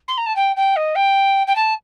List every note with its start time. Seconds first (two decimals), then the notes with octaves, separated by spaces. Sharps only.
0.08 C6
0.17 A#5
0.26 A5
0.35 G5
0.56 G5
0.76 D#5
0.95 G5
1.47 G5
1.55 A5